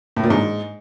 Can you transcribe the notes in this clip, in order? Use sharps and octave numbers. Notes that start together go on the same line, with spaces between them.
A2
A#2
G#2